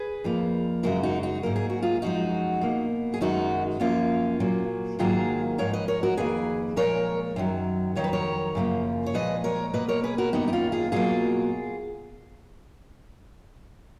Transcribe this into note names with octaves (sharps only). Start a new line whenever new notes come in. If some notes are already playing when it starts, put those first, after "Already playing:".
Already playing: G#4 B4
F2 F3 A#3
F#2 C#3 G#3 F#4 A#4
D#4 F#4
D#4 F#4
G#2 F#3 A#3 A#4
G#4
F#4
F4 G#4
F#2 F3 G#3 D#4 F#4
B2 A#3
G#4
F#2 D#3 G#3 D#4 F#4
F#2 F3 A#3 C#4 F4
A#2 F#3 A#3
G#2 D#3 F#3 A#3 F4 G#4
G#2 F3 G#3 A#4 C#5
B4 D#5
A#4 C#5
F#4 A#4
F2 D#3 A#3 G#4 B4
A#2 F3 G#3 A#4 C#5
F#2 D#3 F#3
F2 D#3 F#3 C#5
B4
A#4 C#5
F#2 C#3 F3 A#3
C#5
A#2 F3 G#3 B4 D#5
A#4 C#5
B2 A#3 B4 D#5
A#4 C#5
G#4 B4
F#4 A#4
F#2 D#3 A#3 B3 D#4
D#4
C#4 F4
F4 G#4
B2 F#3 A#3 F4 G#4